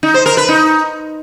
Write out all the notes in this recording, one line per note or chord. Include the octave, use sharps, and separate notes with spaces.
D#4
C5
A#4
B4
D#4